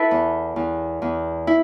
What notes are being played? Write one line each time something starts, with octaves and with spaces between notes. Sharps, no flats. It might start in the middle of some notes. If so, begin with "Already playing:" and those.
Already playing: E4 A4 B4
E2
E2
E2
E4